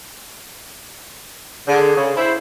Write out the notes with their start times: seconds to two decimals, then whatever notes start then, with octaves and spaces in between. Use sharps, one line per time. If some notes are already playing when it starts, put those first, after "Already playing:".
1.68 D3 G#4
1.96 C#3
2.16 E4 C5